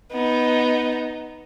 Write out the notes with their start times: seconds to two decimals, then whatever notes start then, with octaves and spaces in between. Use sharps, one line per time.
0.12 B3 D#4